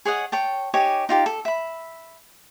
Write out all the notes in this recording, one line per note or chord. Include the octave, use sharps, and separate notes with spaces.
G#4 C#5 D#5 F#5
C#5 G5 A5
D#4 G4 C#5 G#5
D#4 F4 G4
A4
E5 B5